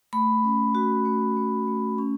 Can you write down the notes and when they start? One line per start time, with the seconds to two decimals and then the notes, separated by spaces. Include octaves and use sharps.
0.13 A3 B5
0.44 C#4
0.75 F#4
1.05 A3
1.36 A3
1.68 A3
1.98 C#4